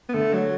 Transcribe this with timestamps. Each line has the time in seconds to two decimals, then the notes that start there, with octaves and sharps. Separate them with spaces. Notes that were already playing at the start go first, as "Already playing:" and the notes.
0.09 B3
0.14 D3 A3
0.34 F#3